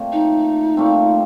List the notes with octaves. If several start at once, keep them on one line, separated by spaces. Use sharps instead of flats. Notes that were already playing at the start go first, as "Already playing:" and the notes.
Already playing: A#2 A3 C4
D#4
A#2 A3 C4